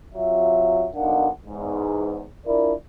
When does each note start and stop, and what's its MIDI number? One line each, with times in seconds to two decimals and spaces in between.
0.14 0.89 48
0.14 0.89 54
0.14 0.89 65
0.14 0.89 76
0.95 1.29 35
0.95 1.29 62
0.95 1.29 63
0.95 1.29 70
0.95 1.29 77
0.95 1.29 78
1.46 2.24 40
1.46 2.24 44
2.47 2.74 62
2.47 2.74 64
2.47 2.74 65
2.47 2.74 70
2.47 2.74 74